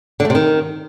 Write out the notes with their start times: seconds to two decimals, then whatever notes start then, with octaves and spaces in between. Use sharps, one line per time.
0.20 D3
0.25 A3
0.30 C3
0.35 D#3